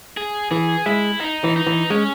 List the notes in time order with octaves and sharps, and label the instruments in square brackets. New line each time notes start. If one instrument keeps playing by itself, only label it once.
[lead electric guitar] G#4
[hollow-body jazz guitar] E3 [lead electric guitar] G#4
[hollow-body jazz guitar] G#3 [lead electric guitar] E4
[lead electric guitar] D#4
[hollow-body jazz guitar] E3
[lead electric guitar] D#4
[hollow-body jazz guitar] E3
[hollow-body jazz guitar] G#3 [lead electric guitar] C#4